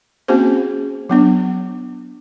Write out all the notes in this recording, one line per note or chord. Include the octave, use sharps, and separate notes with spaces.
A#3 C4 C#4 F#4 G#4 C5
F#3 B3 D4